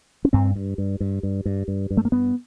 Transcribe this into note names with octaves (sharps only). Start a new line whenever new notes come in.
C#4
G2 C4
G2
G2
G2
G2
G2
G2
G2
A3
A#3
G2 B3